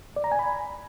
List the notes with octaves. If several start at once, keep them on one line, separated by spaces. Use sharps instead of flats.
D5
A#5
G#5
B5